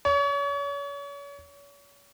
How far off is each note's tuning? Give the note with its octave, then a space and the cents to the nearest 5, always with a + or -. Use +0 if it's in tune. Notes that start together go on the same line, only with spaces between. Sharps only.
C#5 +35